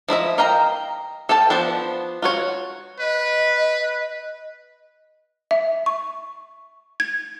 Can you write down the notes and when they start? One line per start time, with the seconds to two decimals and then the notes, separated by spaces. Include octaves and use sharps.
0.09 F3 E4 D#5 E5
0.38 A#4 D#5 F5 G5 A#5
1.29 A4 F5 G5 A5
1.50 F3 B3 D4 C5
2.22 F4 F#4 C#5
3.00 B4 D#5
5.51 E5
5.86 C#6
7.00 G#6